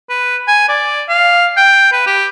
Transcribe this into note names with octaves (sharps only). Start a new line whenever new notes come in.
B4
G#5
D5
F5
G5
B4
G4